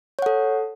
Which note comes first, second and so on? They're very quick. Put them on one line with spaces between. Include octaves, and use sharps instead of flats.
C#5 F#5 A4